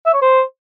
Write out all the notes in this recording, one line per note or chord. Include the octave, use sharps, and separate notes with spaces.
E5
C#5
C5